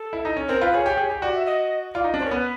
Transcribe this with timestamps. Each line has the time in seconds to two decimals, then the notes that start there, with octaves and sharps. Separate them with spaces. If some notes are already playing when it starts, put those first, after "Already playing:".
Already playing: A4
0.13 E4
0.25 D#4
0.37 C#4
0.49 C4 A#4
0.61 F4 B4
0.74 G#4 C#5
0.86 G4
0.97 G#4
1.10 G4
1.22 F#4 D5
1.34 E5
1.46 D#5
1.95 F4 D5
2.04 D#4
2.14 D4
2.19 C#4 C5
2.26 A#4
2.31 B3 B4